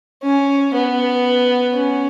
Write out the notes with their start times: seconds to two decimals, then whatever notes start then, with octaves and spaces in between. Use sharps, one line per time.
0.23 C#4
0.74 B3
1.75 C#4